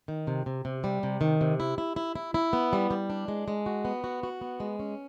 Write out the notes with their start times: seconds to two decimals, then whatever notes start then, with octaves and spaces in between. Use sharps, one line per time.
0.08 D#3
0.27 C3
0.46 C3
0.65 C3
0.84 G3
1.03 C3
1.21 D#3
1.41 C3
1.60 E4
1.78 E4
1.96 E4
2.15 E4
2.34 E4
2.53 B3
2.73 G3
2.91 G3
3.10 D4
3.28 G#3
3.48 G#3
3.66 F#4
3.85 B3
4.04 F#4
4.23 F#4
4.41 B3
4.60 G#3
4.80 C#4